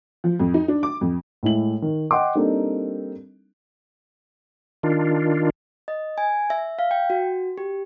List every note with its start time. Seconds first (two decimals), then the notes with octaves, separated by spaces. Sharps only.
0.24 F3
0.40 F2
0.54 D#4
0.68 D4
0.83 D6
1.01 F2
1.43 A2 G#3 E4 F#7
1.82 D#3
2.11 D#5 F#5 G5 C6 D6
2.35 G3 A#3 C4 D4 D#4 A4
4.83 D#3 D4 F4
5.88 D#5
6.18 G#5
6.50 E5
6.79 F5
6.91 G5
7.10 F#4
7.58 G4